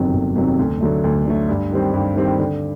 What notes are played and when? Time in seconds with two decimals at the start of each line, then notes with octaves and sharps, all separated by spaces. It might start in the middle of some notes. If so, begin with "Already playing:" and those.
Already playing: G1 F2 C3 D#3 F#3
0.13 G1
0.35 F2 C3 D#3 F#3
0.59 D2
0.81 D3 F#3 A3
1.04 D2
1.26 D3 F#3 A3
1.49 G2
1.71 D#3 G3 C4
1.94 G2
2.16 D#3 G3 C4
2.39 D3